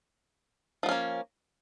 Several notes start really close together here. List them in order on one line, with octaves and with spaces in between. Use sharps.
F3 B3 C#4 A#3